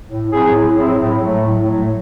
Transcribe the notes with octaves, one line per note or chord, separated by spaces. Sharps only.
A2
F#3 C4 E4 G#4
A2
F#3 C4 E4 G#4
A2
F#3 A3
A2
F#3 A3